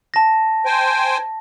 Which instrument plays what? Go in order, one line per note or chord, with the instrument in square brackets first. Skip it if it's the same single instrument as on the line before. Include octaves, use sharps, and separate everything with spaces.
[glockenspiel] A5 A#6
[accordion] C5 G5 G#5